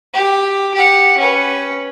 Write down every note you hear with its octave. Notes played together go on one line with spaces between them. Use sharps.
G4
G4 F#5
C#4 B4